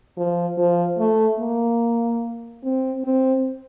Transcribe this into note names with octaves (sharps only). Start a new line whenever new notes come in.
F3
F3
A3
A#3
C4
C4